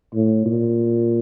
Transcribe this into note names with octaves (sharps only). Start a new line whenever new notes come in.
A2
A#2